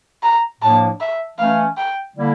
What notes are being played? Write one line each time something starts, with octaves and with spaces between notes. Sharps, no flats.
A#5
A2 F3 A#3 D4 A5
E5
E3 A3 C#4 F5
G5
D3 G3 A#3 E4